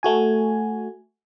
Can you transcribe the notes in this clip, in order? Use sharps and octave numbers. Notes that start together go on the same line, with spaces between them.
A3 F#4 G#5